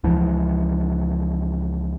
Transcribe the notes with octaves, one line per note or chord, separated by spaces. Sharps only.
C#2 E3 F3